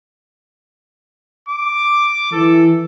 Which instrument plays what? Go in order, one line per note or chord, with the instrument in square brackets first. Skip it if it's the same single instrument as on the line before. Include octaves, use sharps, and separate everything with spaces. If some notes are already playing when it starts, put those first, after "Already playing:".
[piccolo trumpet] D6
[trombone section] E3 [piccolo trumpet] A4